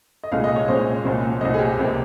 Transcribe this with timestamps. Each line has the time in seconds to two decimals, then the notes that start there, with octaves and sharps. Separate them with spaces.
0.23 D#5
0.32 C2 A#2 G#3 F5
0.44 D#5
0.56 C#5
0.68 C2 A#2 G#3 C5
1.04 C2 A#2 F3
1.40 C2 A#2 F3 D#5
1.54 G#4
1.59 G4
1.77 C#2 C3 F3 A#3